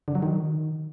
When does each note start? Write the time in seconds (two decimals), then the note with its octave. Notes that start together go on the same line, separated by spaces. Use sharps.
0.08 D3
0.15 F#3
0.23 D#3